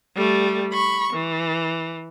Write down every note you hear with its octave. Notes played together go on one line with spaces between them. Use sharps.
G3 A3
B5 C#6
E3